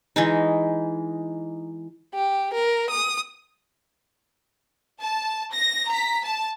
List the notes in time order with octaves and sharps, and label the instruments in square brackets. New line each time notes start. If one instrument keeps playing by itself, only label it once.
[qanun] E3 G#3 D#4
[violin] G4
A#4
D#6
[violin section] A5
A#6
A#5 B6
A5